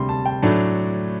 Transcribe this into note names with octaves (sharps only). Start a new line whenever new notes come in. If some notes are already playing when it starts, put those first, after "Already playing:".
Already playing: D2 C3 G3 C6
A5
G5
A2 F#3 A3 D4